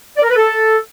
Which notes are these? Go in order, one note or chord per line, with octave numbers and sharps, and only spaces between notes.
D5
A#4
B4
A4